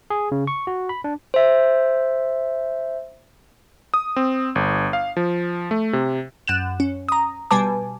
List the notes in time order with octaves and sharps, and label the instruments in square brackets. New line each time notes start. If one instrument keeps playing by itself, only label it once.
[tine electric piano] G#4
C#3
C#6
F#4
B5
D4
[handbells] C5 E5
[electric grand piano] D#6
C4
G1
F5
F3
A3
C3
[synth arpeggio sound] F#2 F#6 E7
C#4
A#5 D#6
B2 G3 B4 G#5 A5 D6